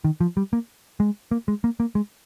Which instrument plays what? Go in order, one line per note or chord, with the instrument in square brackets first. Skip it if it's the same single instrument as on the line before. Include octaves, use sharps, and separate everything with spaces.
[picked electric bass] D#3
F3
G3
A#3
G#3
A#3
G#3
A#3
A#3
G#3